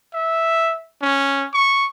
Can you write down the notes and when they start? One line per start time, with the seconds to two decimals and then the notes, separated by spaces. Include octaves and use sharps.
0.14 E5
1.02 C#4
1.54 C#6